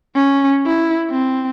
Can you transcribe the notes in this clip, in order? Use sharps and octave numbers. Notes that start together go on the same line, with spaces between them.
C#4
E4
C4